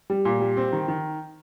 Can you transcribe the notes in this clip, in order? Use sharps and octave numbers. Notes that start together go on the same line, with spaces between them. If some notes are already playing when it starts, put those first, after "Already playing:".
G3
A#2
G3
C4
D#3
D#3